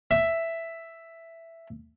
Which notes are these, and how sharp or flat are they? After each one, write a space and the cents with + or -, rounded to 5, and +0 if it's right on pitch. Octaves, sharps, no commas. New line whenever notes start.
E5 +5